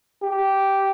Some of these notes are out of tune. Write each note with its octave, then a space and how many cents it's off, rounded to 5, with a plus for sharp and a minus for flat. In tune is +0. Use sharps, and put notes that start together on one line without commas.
G4 -10